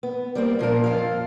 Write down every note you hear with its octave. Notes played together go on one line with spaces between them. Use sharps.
B3
G3 A#3 C4
A#2 F3 F4 A#4
F2 F4 A4 F5